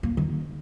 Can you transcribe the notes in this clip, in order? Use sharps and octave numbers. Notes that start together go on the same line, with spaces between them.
A#3
D#3